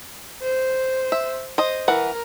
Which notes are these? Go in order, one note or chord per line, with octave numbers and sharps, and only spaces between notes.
C5
E5
C5 D#5
E3 A#4 F#5